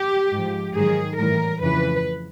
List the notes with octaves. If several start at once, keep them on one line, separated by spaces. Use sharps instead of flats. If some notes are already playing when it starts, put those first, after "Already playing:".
Already playing: G4
G#2 F3
G#2 D#3 F#3 G#4
A2 E3 G3 A#4
F2 C#3 E3 B4